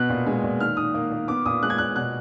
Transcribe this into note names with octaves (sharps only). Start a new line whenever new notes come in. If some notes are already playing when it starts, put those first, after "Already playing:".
Already playing: B2 B3 F#6
A#2
G#3
A#2
D#3 F6
D#3 D#6
A#3
A#3
B3 D6
A#2 D#6
G#3 F#6
G#6
A#2 F#6
B2 F#6